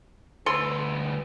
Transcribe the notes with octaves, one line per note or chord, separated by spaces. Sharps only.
D2 A4 B4 C6